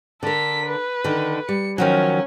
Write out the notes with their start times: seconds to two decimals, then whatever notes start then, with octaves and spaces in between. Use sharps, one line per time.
0.23 D3 A4 A#4 B6
0.66 B4
1.04 D3 D#3
1.49 G3 C#7
1.78 D#3 F3 F#3 C#4